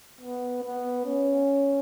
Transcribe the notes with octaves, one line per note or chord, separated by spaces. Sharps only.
B3
B3
C#4